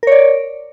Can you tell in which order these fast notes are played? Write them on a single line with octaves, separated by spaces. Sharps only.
A#4 C#5 D5